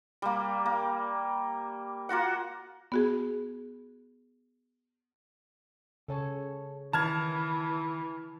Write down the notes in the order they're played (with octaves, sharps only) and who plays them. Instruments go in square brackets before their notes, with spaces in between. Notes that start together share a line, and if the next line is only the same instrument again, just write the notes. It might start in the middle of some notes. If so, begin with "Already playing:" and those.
[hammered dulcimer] G3 A#3
A#3
A#3 F4 F#4 F#5
[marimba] B3 F#4 G#4
[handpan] C#3 C#5 [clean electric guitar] A4 G#5 A5
[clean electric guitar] D#3 [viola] E3 [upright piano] A5 F6 G#6